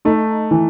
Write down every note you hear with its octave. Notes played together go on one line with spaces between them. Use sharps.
A3 D#4
E3